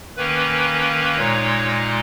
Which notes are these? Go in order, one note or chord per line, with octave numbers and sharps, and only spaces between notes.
D#3 A#3 C#4 B4
A#2 G#3 D#4 C#5
D#5